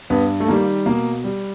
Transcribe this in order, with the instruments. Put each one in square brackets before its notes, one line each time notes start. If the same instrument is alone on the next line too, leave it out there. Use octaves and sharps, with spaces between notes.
[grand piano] G2 B3
A3
D#3 G3 A#3
B2 A#3
G3